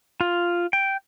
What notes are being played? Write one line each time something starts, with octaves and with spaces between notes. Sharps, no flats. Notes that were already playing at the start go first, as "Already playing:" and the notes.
F4
G5